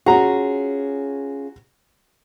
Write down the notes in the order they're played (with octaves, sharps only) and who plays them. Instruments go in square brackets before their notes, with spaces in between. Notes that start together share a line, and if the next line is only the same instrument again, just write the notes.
[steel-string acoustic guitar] C#4 F4 G#4 [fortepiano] F#4 A#5